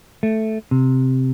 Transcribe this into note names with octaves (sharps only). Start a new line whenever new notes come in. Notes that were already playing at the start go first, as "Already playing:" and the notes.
A3
C3